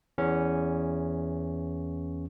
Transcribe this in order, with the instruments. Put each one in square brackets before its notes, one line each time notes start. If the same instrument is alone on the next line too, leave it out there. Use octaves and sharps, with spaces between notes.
[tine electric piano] E2 C#4